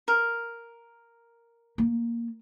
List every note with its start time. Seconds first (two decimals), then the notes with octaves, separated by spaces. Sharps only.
0.08 A#4
1.78 A#3